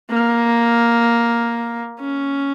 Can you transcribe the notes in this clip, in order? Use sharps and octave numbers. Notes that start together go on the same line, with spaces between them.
A#3
C#4